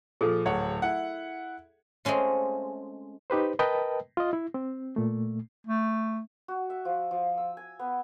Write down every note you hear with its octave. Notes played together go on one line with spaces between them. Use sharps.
A#2 F3 G#4 A4
D1 C#5 F#5
E4 F#5
G#3 A3 C4 C#4 F4
D#4 G4 B4 C5
A#4 B4 D#5 G5 A5
F4 D#5
E4
C4
A#2 A3
A3
F#4
E5
F3
F3
E6
G#5
B3